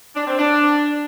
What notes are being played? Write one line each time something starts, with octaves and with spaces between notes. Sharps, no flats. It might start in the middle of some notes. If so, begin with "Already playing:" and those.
D4
C4
D4